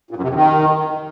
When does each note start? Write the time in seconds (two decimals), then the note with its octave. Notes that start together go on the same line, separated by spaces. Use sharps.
0.11 A#2
0.17 F#2
0.22 C3
0.28 F2
0.34 D#3